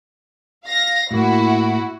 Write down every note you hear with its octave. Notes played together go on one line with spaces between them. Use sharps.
F5 A#6
A2 A#3 E4 F#4